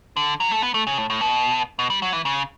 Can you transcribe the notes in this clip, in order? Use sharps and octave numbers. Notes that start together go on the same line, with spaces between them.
D3
F#3
A3
B3
A3
C#3
A2
A2
B2
B2
G3
F#3
E3
C#3